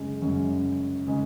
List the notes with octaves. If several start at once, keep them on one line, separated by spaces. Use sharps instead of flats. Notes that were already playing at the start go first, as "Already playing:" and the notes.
Already playing: F#2 C#3 G#3
F#2 C#3 G#3
C#3 G#3